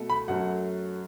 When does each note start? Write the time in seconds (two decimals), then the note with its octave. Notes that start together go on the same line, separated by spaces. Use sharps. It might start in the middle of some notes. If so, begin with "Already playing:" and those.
Already playing: B2 A3
0.10 B5
0.28 F#2 F#3 A3 F#5